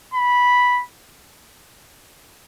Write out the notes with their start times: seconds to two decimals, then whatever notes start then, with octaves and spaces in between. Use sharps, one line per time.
0.14 B5